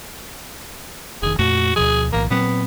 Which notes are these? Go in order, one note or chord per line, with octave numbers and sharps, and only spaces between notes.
F1 D#3 G#4
F2 A#2 A3 F#4
D2 B2 F3 G#4
B1 A2 E3 A#3
A#2 F#3 B3 C4